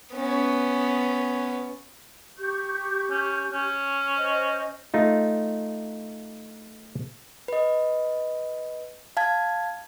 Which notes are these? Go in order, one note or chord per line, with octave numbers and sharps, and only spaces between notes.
B3 C#4
G4 C#6 G6
C#4
C#4
C5 D#5
A3 D#4 F4
B4 D#5
F5 A5 G#6